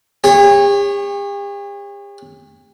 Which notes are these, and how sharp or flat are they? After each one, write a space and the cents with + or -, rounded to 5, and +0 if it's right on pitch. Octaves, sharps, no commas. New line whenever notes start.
G4 +45 C#5 -15